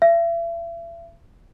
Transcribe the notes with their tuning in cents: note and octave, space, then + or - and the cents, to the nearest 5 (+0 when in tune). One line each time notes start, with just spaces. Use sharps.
E5 +40